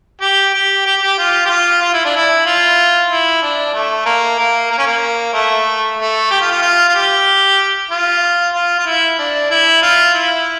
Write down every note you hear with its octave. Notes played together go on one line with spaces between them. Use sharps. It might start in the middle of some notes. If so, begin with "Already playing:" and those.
G4
G4
G4
G4
F4
G4
F4
F4
E4
D4
E4
F4
E4
D4
A3
A#3
A#3
A#3
C#4
A#3
A3
A3
G4
F4
F4
F4
F4
G4
F4
F4
F4
E4
D4
E4
F4
E4